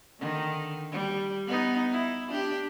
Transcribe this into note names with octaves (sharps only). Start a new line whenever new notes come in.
D3 D#3
G3
B3 D#4
E4
D4 G4